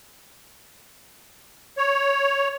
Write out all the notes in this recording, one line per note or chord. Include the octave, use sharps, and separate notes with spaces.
C#5